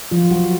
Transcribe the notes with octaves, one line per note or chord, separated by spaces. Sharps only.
F3 F4
F#3 F#4